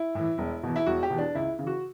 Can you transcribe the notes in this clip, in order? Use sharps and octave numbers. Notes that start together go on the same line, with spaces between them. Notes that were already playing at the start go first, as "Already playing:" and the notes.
Already playing: E4
A2 E3
E1
E2 B2
E4
E1 F#4
G4
E2 B2
D4
C#2 E4
C#3 E3
F#4